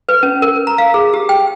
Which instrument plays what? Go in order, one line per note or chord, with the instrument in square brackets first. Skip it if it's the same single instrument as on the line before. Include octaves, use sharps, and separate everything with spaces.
[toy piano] B4
C#4
A#4
A#5
F5
G#4
G4
G5